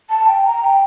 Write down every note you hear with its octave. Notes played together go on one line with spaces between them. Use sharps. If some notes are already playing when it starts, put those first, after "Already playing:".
A5
G5
A#5
G5